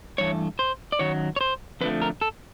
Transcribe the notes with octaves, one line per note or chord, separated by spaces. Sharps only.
G2 E3 A3 C#5
C5
D5
F#2 D#3 F#3 C#5
C#5
C5
F2 D3 F3 A3 B4
A#4
A4